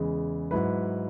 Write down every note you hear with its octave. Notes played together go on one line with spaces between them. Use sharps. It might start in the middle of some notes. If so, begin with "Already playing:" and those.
Already playing: E2 C#3 E3 G#3
G#2 F#3 E4 B4